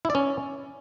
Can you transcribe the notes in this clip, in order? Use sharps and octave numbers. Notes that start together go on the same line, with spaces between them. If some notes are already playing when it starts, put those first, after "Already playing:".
E4
D5
C#4